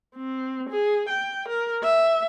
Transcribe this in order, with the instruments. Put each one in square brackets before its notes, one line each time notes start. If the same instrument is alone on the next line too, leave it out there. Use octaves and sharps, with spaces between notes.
[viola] C4
G#4
G5
A#4
E5